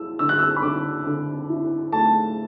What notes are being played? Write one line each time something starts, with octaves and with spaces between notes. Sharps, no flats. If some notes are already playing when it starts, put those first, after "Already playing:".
Already playing: E4 E6
D3 E6
F#6
E6
B5
D3 D6
D3
E4
A3 A5